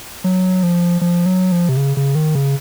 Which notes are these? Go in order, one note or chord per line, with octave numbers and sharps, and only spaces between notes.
F#3
F3
F3
F#3
F3
C3
C#3
C#3
D#3
C#3